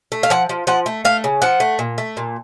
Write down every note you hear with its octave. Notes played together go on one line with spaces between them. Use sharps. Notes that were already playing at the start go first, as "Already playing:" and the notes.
A3
F5
F3 F#5
F3
F3 F#5
A3
A3 F5
C#3
F3 F#5
A3
A#2
A3
A#2